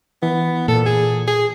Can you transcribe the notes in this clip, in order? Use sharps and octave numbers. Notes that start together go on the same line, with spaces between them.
E3 B3
A#2 A4
G#4
G#4